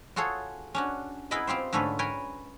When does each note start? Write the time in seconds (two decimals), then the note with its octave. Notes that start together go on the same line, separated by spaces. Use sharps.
0.16 F4 F#4 G#4 A4 C#5
0.75 C#4 D4 F#4
1.31 B3 E4 G#4 A#4 D#5 B5
1.47 C4 F4 G4 C5
1.73 G#2 D3 A3 C#4 A4 B4
1.99 A#4 B4 C#5 G5 G#5